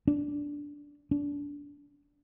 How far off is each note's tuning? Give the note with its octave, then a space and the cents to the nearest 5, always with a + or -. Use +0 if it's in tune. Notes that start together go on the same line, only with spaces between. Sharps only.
D4 -10
D4 -25